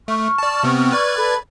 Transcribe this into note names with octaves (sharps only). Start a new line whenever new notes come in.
A3 C#6 F6
D5 A5
C3 B3 C4
B4 D5 G#6
A4 B5